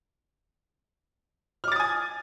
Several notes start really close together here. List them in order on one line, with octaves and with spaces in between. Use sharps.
F6 D6 A6 D#6 G#5